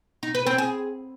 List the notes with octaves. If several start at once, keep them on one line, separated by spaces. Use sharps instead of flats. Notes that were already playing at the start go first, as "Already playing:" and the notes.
D#4
B4
C4
G#4